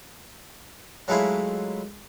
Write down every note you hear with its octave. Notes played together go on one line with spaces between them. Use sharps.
F#3 G#3 A3 E4 F4